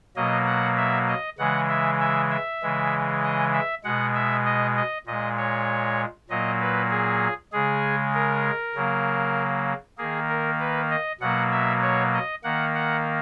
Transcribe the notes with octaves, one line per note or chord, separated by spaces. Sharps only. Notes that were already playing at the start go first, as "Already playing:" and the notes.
B2 F#3 A#3 D#5
F#5
E5
D#5
C#3 E3 G#3 F#5
E5
E5
E5
C#3 E3 G#3
D#5
E5
B2 G#3 F#5
E5
D#5
D#5
A#2 G#3 D#5
C#5
A#2 F#3 A#3 D#5
B4
G#4
C#3 G#3 G#4
A#4
C#3 F#3 A#3
D#3 A#3 G#4
A#4
B4
D#5
B2 F#3 A#3 F#5
E5
C#5
D#5
D#3 A#3 F#5
F#5